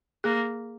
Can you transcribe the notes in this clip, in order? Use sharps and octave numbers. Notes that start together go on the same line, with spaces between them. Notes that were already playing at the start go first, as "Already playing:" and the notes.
A#3 G#4